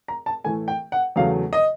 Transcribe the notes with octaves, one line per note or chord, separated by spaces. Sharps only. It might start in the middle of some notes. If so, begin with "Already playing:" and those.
A#5
A5
A2 E3 A3 G#5
G5
F#5
E2 C#3 F#3 A3 F5
D#5